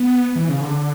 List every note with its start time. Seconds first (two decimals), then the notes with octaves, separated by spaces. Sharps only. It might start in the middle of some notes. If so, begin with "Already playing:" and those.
Already playing: B3
0.36 E3
0.49 C#3
0.61 D3